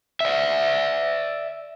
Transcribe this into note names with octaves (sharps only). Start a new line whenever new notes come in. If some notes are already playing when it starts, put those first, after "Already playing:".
D5 E5